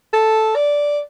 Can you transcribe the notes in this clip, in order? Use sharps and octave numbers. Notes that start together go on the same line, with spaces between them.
A4
D5